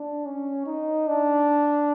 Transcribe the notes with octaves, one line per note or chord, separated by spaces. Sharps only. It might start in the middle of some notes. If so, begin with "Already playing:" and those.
Already playing: D4
C#4
D#4
D4